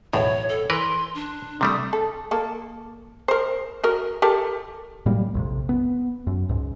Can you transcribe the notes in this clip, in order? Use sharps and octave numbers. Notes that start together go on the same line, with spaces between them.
B1 E2 A2 C#5
A4
E3 A#4 B4 C6
D4
C3 G3 A3 D#6
A4
A#3 A4
A#4 C5
F#4 A#4
G4 A4 A#4
A2 F#3 G3 A#3
A#1 F2 C3
B3
F#2
C#2 G#2